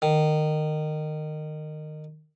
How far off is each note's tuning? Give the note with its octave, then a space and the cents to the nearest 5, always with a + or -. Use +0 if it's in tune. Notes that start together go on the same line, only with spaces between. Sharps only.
D#3 -20